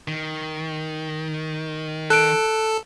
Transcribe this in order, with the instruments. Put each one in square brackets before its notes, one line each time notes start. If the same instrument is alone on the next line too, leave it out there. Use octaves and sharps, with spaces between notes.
[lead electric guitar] D#3
[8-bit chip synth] A4 [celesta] F#6 D7